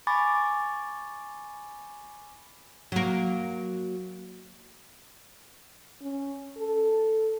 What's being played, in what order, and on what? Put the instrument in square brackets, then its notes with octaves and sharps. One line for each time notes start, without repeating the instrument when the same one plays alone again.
[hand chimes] G#5 B5 C#6 D6 A6
[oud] F#3 A#3
[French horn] C#4
A4